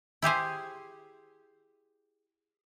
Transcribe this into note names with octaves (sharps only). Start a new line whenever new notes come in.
E4 G4 G#4 C5